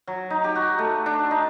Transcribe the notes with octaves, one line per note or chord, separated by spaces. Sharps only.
F#3
D#4
G4
F#4
A3
D4
D#4